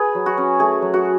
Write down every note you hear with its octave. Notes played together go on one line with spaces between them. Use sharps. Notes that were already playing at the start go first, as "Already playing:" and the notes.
Already playing: G#4 B4
F#3
F#4
C#4
A3 G#4
F#3
F#4